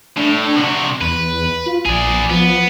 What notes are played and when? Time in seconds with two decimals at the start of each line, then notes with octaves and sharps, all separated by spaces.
0.17 A2 D4
0.57 C3 F#4
1.01 E2 B4
1.66 F4
1.86 A#1 G#4 D5
2.30 F3 B3